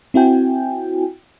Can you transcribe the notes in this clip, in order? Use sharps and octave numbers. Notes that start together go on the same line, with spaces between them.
C4 E4 F#4 G5 G#5